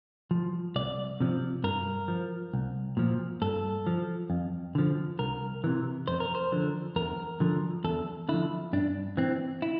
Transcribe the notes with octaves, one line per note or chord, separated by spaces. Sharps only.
F3
C2 D5
C3 F3
G2 A#4
F3
C2
A#2 F3
G2 A4
F3
F2
D3 F3
C2 A#4
C3 E3
F2 C5
A#4
C5
D3 F3
E2 A#4
D3 F3
E2 A4
D3 F3 E4
G2 D4
E3 C4
E4